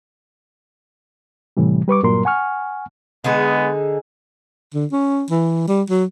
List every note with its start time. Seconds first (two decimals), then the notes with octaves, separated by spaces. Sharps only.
1.57 A2 C3 E3 G3
1.88 G3 B4 C#6 D6
2.03 G2 A#2 F#3 A#4 C6
2.25 F#5 G#5 C#6 F6
3.24 D3 G#3 B3 D#4 G#4
4.74 D3
4.92 C#4
5.30 E3
5.68 G3
5.90 F#3